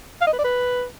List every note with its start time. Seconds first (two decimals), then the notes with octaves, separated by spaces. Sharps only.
0.21 F5
0.27 D#5
0.33 B4
0.39 D5
0.44 B4